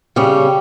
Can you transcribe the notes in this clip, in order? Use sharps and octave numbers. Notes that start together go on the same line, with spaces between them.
C#3 G3 C#4